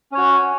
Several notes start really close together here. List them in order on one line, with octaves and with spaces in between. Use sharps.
C#4 C#5 F#4